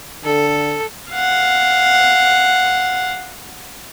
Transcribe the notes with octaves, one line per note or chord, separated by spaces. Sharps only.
D3 A4
F5 F#5